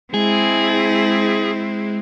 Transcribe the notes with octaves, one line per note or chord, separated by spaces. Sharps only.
G#3 C4 E4 G#4